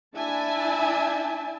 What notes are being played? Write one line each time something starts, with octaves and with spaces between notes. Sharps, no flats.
D4 E4 E5 G#5 A5